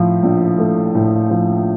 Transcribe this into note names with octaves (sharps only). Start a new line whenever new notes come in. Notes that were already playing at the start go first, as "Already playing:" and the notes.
Already playing: A2 F3
A#1
A3
A2
F3